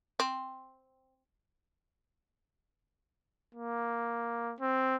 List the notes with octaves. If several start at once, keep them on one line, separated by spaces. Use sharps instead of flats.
C4
A#3
C4